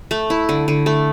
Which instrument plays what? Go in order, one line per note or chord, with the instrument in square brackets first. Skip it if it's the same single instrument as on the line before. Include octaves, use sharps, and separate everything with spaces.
[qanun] A3
E4
D3
D3
A3